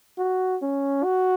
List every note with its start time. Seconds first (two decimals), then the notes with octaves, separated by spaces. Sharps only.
0.18 F#4
0.62 C#4
1.04 F#4